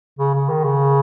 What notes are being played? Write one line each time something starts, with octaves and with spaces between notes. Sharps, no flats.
C#3
C#3
D#3
C#3